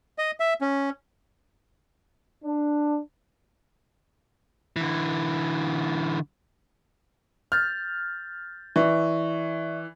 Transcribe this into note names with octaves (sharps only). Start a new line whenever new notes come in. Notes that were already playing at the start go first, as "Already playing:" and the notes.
D#5
E5
C#4
D4
D3 E3
F6 G6 A6
E3 D5 E5 C#6